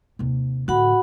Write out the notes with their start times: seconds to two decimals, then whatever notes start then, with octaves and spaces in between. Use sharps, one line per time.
0.19 D#2 C3
0.68 A2 D3 F#4 F#5 B5